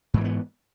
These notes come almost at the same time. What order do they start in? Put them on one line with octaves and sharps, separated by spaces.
G#2 E3 A#3 B3